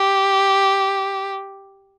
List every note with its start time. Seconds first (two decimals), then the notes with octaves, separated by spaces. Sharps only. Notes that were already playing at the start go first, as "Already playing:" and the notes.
Already playing: G4